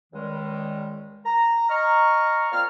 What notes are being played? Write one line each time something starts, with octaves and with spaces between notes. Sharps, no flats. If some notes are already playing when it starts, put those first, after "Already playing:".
C#2 D#3 G3 G#3
A#5
D#5 A#5 C#6 F6
A#3 C4 F4 D5 F6